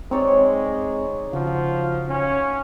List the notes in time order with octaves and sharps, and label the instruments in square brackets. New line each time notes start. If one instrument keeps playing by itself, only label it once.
[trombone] G#3 [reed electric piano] C4 [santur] D#4 C#5 D5
[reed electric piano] C#3 [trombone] F3 [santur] F#4
[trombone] C#4